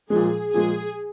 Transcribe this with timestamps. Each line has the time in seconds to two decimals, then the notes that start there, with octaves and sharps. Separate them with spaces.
0.10 A#2 F3 G#3 G#4
0.54 A#2 F3 G#3 G#4